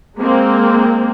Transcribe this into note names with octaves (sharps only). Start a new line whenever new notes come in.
G#3 A#3 C4